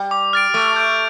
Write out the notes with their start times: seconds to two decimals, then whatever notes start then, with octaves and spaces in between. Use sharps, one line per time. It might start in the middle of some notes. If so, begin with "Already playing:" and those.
Already playing: G3
0.11 D6
0.33 F6 A6 D7
0.54 A3 D6
0.76 G6 D7